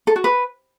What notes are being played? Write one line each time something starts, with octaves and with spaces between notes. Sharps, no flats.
A4
F#4
B4